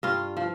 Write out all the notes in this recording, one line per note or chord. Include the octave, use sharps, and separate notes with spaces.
G2 F4
F3